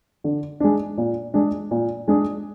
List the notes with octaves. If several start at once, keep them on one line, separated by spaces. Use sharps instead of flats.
D3
G#3 D4
A#2
G#3 D4 G#4
A#2
G#3 D4 G#4